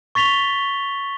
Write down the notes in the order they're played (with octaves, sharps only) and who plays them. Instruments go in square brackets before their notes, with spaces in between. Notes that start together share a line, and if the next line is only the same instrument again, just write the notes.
[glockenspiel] C#6 A6 B6 F7 G7